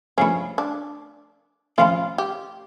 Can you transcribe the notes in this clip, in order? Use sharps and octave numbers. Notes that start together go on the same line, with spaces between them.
G2 F3 A3 C#4 E4
D4
A2 F3 C#4 E4 F4
G4